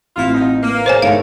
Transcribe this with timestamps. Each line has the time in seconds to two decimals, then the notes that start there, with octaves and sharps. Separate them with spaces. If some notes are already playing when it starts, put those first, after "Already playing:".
0.17 A1 C4 E4 F4
0.34 B2 D#4
0.63 A#3 B4
0.86 G#4 A#4 C5 C#5 G#5
1.02 E2 G#2 A3 C#5 F5